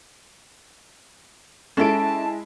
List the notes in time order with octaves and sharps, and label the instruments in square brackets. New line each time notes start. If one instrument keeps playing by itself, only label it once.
[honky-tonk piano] G#3 E4 D7 [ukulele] C#4 A4 [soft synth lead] A5